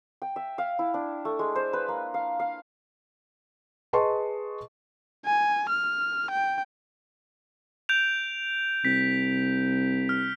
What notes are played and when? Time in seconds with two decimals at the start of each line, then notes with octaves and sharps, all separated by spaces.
0.22 G5
0.36 E5
0.58 F5
0.79 E4
0.94 D4
1.25 A3
1.39 G#3
1.55 C5
1.73 B4
1.88 A#3
2.14 F5
2.39 F5
3.93 G#4 B4 D#5 A5 C6 C#6
5.26 G#5
5.70 F6
6.31 G5
7.89 G6 D7 F7
8.85 C2 B6
10.09 F6